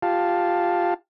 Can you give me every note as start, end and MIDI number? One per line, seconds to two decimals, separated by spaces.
0.03 0.94 65
0.03 0.94 67
0.03 0.94 77
0.03 0.94 81